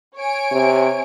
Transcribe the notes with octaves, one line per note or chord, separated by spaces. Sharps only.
C#5 G#5 D7
C3